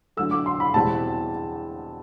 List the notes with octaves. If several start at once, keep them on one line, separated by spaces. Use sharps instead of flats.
D3 F#3 A3 E6
D6
C6
B5
E2 B2 G3 C4 E4 A5